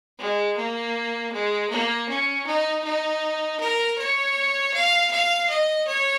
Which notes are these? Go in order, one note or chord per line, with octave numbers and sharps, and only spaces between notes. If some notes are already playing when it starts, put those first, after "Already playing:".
G#3
A#3
G#3
A#3
C#4
D#4
D#4
A#4
C#5
F5
F5
D#5
C#5